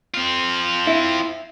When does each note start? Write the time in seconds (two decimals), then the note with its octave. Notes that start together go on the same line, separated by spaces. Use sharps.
0.14 C4 F4
0.87 E4